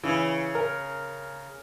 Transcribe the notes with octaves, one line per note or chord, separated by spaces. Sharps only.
C#3 E3
A#4